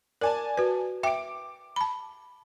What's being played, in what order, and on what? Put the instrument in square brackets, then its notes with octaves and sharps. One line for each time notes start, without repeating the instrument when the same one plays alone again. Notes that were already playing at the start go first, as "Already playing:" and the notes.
[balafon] A#4 [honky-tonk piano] D5 G#5 A5
[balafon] F#4 B4
[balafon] E5 G5 [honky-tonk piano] D6 D7
[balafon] A5 B5